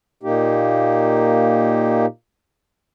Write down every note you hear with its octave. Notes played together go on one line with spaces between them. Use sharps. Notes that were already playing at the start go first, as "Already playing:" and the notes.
A#2 A#3 D#4 G4